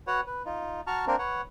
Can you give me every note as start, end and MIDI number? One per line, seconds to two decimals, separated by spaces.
0.07 0.21 66
0.07 0.21 71
0.07 0.21 73
0.07 0.21 78
0.27 0.43 71
0.45 0.81 63
0.45 0.81 65
0.87 1.05 66
0.87 1.05 81
0.87 1.05 82
0.87 1.05 85
0.87 1.05 89
1.07 1.16 58
1.07 1.16 60
1.07 1.16 62
1.07 1.16 70
1.19 1.41 71
1.19 1.41 73
1.19 1.41 78